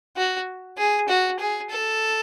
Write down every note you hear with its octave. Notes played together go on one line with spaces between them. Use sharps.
F#4
G#4
F#4
G#4
A4